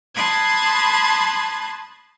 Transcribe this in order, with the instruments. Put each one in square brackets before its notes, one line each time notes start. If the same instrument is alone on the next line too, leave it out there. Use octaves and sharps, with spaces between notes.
[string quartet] A5 B5 C6 D#6 F#6 G#6